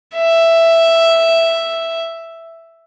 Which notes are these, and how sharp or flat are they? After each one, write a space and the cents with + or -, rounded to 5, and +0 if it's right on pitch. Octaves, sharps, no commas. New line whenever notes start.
E5 +5